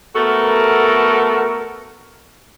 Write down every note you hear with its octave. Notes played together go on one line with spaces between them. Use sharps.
A3 B3 F#4 A4 A#4